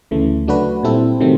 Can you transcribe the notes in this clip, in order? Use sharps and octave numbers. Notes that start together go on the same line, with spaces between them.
D2 C#3 E3 A3
F#3 A3 D4 F#4 B4
A#2 G3 C4 E4 A4
C3 D#3 F#3 A3 C4